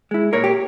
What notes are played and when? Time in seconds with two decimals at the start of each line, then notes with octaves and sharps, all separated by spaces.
0.11 G#3 E4
0.33 A#2 A#4 C#5
0.44 G4